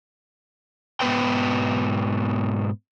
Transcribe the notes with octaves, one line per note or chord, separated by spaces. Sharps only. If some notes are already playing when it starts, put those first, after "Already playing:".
G#2 B2 B3 B4 G5